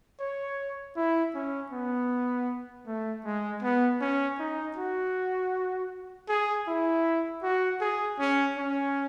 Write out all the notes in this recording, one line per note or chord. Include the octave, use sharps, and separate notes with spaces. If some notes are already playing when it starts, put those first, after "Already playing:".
C#5
E4
C#4
B3
A3
G#3
B3
C#4
D#4
F#4
G#4
E4
F#4
G#4
C#4
C#4